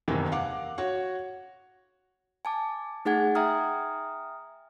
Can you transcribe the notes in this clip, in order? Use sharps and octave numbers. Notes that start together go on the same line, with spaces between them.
F#1 E2 C3 D#3 E3
F5 F#5 D6
F#4 C#5 F#5
G#5 A5 D6
A3 D#4 G#4 F#5 G#5 G#6
E5 G5 G#5 A#5 D#6 F6